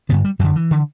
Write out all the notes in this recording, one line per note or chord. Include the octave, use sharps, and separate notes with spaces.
G2 D3 B3
G3
F#2 D3 F#3
E3
D3